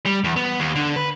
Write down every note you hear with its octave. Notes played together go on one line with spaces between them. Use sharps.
G3
E2
B3
D#2
D3
B4